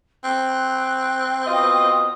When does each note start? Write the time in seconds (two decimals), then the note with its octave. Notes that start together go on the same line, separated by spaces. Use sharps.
0.24 C4 F#6
1.47 B2 F4 D#5 D#6